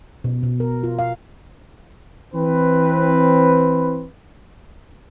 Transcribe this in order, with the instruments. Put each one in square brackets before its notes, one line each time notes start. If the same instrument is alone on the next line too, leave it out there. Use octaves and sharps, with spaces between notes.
[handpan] B2
B2
A#4
F4
F5
[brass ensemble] E3 C4 B4